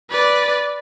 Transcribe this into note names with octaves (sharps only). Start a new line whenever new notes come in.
B4 D5